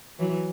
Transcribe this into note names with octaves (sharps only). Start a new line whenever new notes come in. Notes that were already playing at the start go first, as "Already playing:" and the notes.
E3 F#3